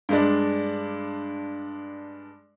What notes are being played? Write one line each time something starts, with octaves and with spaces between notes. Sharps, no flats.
G2 G#3 D4